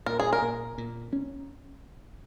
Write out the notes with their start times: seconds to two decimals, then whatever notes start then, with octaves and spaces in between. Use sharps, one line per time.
0.06 A#2 A#4
0.20 G#4
0.33 A#4
0.42 A#2
0.78 A#2
1.13 C#4